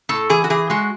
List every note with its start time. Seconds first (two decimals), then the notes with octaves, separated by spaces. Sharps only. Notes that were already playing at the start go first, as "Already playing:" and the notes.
0.09 A2 A4
0.29 E3 G#4
0.44 F#4
0.50 E3 G#4
0.70 G#3 F#4